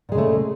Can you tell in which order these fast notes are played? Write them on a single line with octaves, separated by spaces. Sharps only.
A#2 G#3 C#3 A3